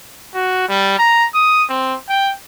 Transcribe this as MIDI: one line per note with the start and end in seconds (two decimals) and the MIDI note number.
0.34 0.68 66
0.68 0.94 55
0.99 1.26 82
1.34 1.63 87
1.69 1.95 60
2.09 2.33 79